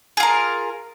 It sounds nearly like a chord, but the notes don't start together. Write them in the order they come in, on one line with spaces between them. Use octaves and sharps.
G#4 F4 A#4